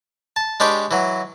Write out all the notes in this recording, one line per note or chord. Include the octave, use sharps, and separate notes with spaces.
A5
G#3 D4 G4 B4 C#5 G5
E3 F#3